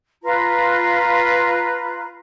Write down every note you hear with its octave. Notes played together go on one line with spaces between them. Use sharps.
F4 B4 A#5